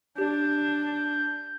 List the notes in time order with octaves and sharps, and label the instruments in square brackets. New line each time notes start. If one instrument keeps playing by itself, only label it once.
[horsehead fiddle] D4 [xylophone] G4 [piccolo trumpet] G6